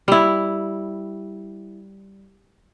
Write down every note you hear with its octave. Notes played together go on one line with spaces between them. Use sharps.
G3 E4